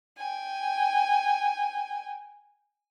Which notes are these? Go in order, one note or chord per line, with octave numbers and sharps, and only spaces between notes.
G5 G#5